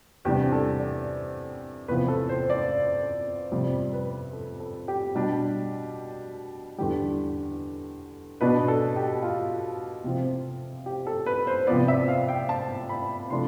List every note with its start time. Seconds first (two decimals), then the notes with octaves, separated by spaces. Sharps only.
0.25 E2 C3 G3 D4 G4
0.52 A4
0.79 D5
1.88 E2 C3 F3 B3 B4
2.08 A4
2.29 C5
2.50 D5
3.52 F2 C3 G3
3.93 B4
4.33 A4
4.60 A4
4.88 G4
5.15 B2 G3 D4
6.78 E2 D3 G3 G4
8.41 B2 B3 D4 B4
8.68 A4
8.96 G4
9.23 F4
10.04 C3 F3 C4
10.86 G4
11.07 A4
11.26 B4
11.47 C5
11.67 B3 D5
11.70 C3 F3
11.88 E5
12.08 F5
12.28 G5
12.49 A5
12.89 B5
13.30 C3 F3 A3 D4 C6